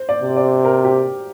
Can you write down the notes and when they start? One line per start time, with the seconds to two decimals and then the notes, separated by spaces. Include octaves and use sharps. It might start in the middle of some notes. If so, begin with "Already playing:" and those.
Already playing: C5
0.09 D5
0.23 C3
0.36 D5
0.65 A#4
0.85 G4